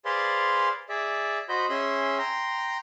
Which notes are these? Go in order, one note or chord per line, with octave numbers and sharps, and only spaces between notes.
G#4 B4 C5 D5 F5 C6
G#4 D5 E5
F#4 C5 D#5 B5 G6
C#4 G#4 E5 C6
G5 A#5 C6